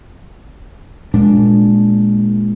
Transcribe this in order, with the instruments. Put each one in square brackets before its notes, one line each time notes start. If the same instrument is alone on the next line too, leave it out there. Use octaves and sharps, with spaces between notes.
[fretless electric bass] A#2 G#3 D4